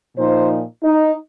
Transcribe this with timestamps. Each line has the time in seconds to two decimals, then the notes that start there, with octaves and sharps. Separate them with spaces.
0.17 A#2 F3 D#4 C5
0.83 D#4